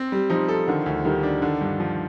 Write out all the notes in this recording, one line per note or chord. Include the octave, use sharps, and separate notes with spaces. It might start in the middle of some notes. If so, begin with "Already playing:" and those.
Already playing: C4
G3
F3 D#4
A4
D3 D#3
D2
D#3 G3
D4
D3
G2
F3